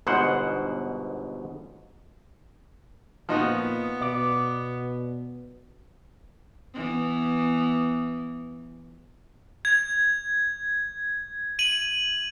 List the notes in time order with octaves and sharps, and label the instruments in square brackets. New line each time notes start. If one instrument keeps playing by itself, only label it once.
[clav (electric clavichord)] G1 G#2 B2 C5 F#5
[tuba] A#2 [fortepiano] F3 D#4 F#4 [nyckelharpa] B3
[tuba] B2 [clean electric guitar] D5
[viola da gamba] E3 B3
[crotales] G#6
D#7 F#7